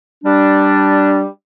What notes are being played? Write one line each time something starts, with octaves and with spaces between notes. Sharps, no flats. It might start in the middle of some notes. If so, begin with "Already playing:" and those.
G3 D4